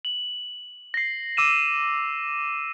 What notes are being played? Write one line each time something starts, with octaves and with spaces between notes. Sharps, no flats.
F#7
A#6 C7
D6 E6 D#7 E7